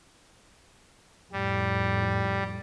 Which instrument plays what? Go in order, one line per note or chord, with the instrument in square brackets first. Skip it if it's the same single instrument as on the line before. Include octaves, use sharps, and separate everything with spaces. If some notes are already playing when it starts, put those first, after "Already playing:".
[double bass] F2 A2 [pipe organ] G3